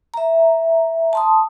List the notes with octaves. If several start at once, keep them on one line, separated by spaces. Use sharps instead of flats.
E5 A#5
A5 C6 D#6